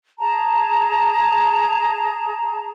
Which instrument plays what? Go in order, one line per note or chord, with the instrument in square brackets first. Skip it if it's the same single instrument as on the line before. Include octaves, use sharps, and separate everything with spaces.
[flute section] G#4 A5 A#5